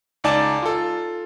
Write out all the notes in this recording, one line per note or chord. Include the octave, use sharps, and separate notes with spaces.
C#2 D#4 D5 G#5 A5
F4 A4